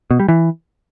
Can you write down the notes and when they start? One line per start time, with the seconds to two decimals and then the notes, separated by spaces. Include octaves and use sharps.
0.11 B2
0.20 G3
0.29 E3